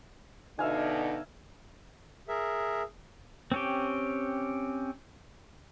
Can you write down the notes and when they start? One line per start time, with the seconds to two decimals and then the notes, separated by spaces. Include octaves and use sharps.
0.59 B2 D3 D#4 E5 F5 G#5
2.28 G#4 A#4 E5
3.52 C4 C#4 G4